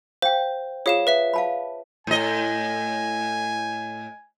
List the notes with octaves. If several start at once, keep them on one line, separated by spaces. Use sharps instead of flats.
C5 F5 G5
F4 G#4 C#5 F5 D#6 E7
B4 E5 B6
F5 A5 B5
A2 D#5 G#5